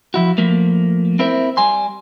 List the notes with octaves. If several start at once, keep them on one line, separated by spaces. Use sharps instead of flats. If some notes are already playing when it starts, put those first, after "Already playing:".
F3 E4 F#4
F3 A3 A#3
C4 E4 A#4 C5 E5
G3 G#5 C6